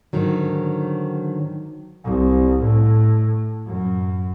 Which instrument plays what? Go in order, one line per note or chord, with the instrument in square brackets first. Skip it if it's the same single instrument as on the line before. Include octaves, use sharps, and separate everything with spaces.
[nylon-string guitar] G#2 D3 D#3 F#3
[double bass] C2
A2
F#2